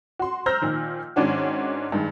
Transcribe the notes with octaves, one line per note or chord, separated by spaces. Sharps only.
F#4 C6
C5 A#5 E6 F6 G6 A#6
A#2 D#3 F3
G#2 D#3 C#4 D4 F#4
G2 D#3 G#3